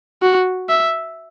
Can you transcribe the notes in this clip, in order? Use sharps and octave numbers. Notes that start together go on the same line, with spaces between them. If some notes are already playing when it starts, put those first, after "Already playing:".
F#4
E5